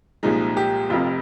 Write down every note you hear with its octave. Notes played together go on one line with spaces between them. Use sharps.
C2 A#2 F3 G#3 D#4
G4
F1 F2 C3 F4